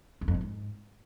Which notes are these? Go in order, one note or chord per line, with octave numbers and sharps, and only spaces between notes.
E2
F2
A2
G#2